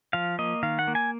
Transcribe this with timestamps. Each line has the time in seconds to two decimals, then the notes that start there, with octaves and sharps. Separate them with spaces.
0.13 F3 F5
0.39 A#3 D#5
0.63 D#3 F5
0.79 F#5
0.88 A#3
0.95 G#5